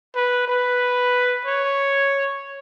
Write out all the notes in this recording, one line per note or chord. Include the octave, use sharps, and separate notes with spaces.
B4
B4
C#5